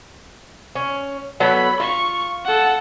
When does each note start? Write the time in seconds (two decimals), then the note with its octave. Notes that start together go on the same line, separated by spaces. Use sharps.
0.76 C#4
1.40 F#3 B3 A4 B5
1.80 F4 C#6
2.45 A4 F#5